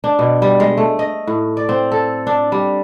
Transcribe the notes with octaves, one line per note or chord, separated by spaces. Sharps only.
D4
B2
G3
G#3
A3
D#5
A2
D5
C4
A4
D4
G3